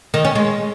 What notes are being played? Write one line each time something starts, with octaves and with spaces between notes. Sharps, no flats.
D#3
C#4
G#3